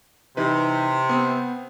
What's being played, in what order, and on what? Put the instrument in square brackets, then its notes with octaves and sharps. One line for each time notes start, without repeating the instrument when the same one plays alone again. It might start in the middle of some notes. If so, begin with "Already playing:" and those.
[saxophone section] C3 [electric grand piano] E3 D#4 B4
[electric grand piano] B3 C4